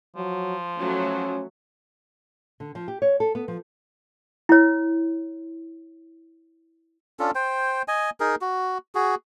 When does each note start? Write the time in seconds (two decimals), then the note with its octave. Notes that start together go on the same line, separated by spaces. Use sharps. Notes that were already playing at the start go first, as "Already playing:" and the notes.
0.16 F3 F#3
0.79 F#3 A3 C#4
2.60 D3
2.75 F3
2.88 G4
3.02 C#5
3.20 A4
3.35 B3
3.48 F3
4.49 E4 C#5
7.19 C#4 D4 F4 A4
7.35 C5 G5
7.88 D#5 G#5
8.20 D#4 G#4 A#4
8.41 F#4
8.95 F#4 G#4